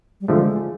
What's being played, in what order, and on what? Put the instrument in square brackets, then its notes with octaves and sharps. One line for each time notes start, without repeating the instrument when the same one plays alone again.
[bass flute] G3
[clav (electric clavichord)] D3 F3 A3 [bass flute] G#3